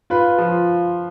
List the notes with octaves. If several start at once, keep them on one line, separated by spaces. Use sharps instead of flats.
F4 B4
F3